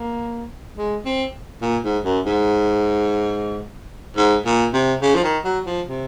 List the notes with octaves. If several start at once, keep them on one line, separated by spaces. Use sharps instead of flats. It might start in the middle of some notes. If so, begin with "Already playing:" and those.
Already playing: A#3
G#3
C4
A#2
G#2
F#2
G#2
G#2
A#2
C3
C#3
F3
D#3
F#3
F3
C3